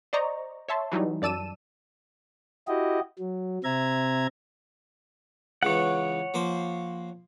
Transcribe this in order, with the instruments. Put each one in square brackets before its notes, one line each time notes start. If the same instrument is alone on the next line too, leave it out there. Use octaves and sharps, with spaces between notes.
[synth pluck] C5 D5 D#5 A#5 C#6
C#5 E5 A5 C6
E3 F#3 G3 D#4
F#2 D5 A5 E6 D#7 E7
[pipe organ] E4 F#4 G4 D#5
F#3
C3 C4 E5 A#5 G#6
[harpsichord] C#2 C#3 E3 [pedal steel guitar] C#5 F#5
[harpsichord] F3 A#3 C5